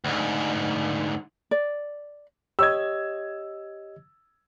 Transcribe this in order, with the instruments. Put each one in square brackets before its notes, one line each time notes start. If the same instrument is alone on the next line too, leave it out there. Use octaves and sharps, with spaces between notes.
[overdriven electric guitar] D2 G#2
[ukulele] D5
[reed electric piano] G4 C#5 D#5 [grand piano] E6 G#6